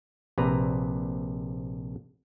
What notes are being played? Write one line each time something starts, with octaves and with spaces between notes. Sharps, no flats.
A#1 C3 B4 A#5